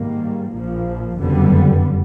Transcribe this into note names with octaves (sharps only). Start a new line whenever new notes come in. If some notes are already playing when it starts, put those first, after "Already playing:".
Already playing: G#2 D#3 G3 A#3
A#1 A#2 F3
F#1 F2 D3 G3 B3